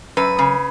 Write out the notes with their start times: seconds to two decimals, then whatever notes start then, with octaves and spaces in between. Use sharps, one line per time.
0.17 F#2 B4
0.39 C#3